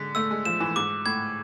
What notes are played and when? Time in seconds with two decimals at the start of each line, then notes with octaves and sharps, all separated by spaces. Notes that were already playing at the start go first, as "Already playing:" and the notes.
Already playing: D3 G#3 B6
0.15 A3 E6
0.31 G#3
0.45 F3 E7
0.60 E3
0.76 G#2 D6
1.05 A2 G#6